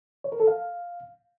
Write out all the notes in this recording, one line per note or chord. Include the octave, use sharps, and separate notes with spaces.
C#5
A#4
A4
F5